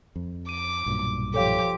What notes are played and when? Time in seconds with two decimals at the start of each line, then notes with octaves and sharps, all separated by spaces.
0.16 F2
0.49 D6 D#7
0.86 B1 G2 A#2
1.34 F3 G4 A4 C#5 F5 D6